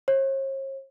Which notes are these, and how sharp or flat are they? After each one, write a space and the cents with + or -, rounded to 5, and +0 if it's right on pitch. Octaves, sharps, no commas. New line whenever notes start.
C#5 -45